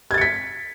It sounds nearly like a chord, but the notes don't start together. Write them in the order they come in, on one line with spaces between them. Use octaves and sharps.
G#6 A6 C#7 B6